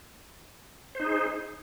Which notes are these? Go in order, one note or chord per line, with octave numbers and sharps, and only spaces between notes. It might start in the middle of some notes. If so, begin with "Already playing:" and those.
D#4 G#4 C5